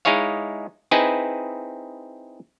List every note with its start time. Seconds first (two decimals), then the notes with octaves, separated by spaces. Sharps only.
0.05 G#3 D#4 E4 G#4 C#5 F5
0.91 C4 D#4 E4 G#4 B4 G#5